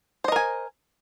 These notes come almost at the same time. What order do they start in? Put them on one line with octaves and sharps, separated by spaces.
C5 D#5 A#4 G#5